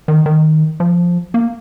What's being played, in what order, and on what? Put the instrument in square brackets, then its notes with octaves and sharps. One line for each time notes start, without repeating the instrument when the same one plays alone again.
[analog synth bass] D#3
D#3
F3
A#3